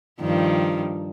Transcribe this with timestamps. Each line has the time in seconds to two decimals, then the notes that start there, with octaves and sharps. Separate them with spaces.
0.20 G2 D#3 F3